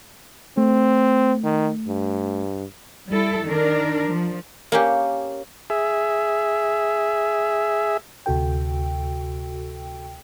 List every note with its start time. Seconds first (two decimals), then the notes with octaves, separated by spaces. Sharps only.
0.57 A3 C4
1.44 D#3
1.88 G2
3.08 G3 E4 A4
3.44 D#3 D4 A#4
4.08 F3
4.72 A#3 C#4 G4
5.70 G#4 E5
8.26 D2 C3 F#4 A4 G5